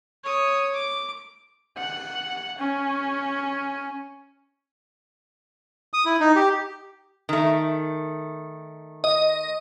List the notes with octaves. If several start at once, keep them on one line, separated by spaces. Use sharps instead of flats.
C#5 D#6
D6
F#5
C#4
D#6
E4
D#4
G4
D#3 A3
D#5